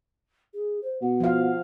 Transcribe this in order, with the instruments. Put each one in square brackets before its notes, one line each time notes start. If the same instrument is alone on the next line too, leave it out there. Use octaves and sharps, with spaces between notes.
[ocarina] G#4
C5
[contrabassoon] B2 [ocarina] F#5
[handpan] F3 F5